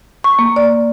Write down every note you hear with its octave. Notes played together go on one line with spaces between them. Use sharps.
C#6
A#3
D5